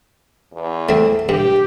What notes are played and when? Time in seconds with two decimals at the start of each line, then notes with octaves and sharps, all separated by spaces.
0.53 E2
0.89 A3 C4
1.29 G2 G4